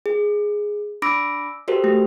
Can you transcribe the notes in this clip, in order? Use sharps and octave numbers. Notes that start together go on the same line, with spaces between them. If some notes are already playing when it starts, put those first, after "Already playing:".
G#4
D4 B5 D6 E6 A#6 D7
F#4 G4 A4 A#4 C5
A3 G4